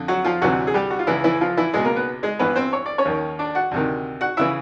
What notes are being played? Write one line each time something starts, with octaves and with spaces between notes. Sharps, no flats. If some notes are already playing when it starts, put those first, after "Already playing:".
Already playing: F2 D3
F#3 F#4
F3 F4
D2 C3 E3 F#3 F#4
G#4
G3 G4
F#4
F4
C#2 C#3 E3 E4
E3 E4
F3 F4
E3 E4
C#2 B2 G#3 G#4
A#3 A#4
B3 B4
G#3 G#4
G2 E3 B3 B4
C4 C5
C#5
D5
C#4 C#5
D#2 D#3
D4 D5
F#4 F#5
D2 C3 D#3
F#4 F#5
C#3 E3 E4 E5